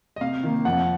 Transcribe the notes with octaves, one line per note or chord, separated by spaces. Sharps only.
D#5
C3 F5
D#3 A#3
F2 F#5